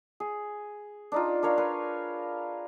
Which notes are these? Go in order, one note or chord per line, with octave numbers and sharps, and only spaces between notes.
G#4
D4 D#4 F4
D4 A#4 C#5 F5
A#4 B4 F5